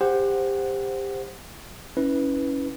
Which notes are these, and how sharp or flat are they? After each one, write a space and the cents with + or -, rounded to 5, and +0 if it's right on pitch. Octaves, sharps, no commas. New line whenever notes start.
G4 +25 C5 +0 F#5 +0
C#4 +0 E4 -30 B4 +0